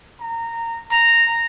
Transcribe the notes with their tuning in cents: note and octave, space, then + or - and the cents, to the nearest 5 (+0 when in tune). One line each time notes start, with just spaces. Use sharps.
A#5 -20
A#5 -10